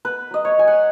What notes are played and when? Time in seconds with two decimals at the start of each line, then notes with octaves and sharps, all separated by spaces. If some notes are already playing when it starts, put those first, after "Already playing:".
0.05 B3 B4
0.31 F#3 D#5
0.45 C#5
0.58 F#3 G#5
0.67 F#5